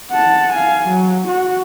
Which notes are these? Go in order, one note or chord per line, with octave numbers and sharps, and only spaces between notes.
F#5 A5
F5 G#5
F#3
F#4